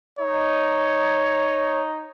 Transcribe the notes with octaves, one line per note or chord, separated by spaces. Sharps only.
D#4 C#5